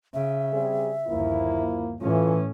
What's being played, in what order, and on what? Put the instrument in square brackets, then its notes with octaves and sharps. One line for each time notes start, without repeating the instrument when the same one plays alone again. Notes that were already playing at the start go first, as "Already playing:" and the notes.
[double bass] C#3 [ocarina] E5
[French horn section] G3 C4 G#4
[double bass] G1 D#2 [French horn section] F3 A#3 E4
[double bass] A2 C#4 [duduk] E3 [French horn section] A3 F4